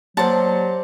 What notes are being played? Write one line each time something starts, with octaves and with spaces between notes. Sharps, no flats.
F#3 A#3 G4 C5 D5 F#5 A5 C6